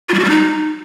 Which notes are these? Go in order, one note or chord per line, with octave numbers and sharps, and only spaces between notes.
F4
G3
F#4
G3
D#4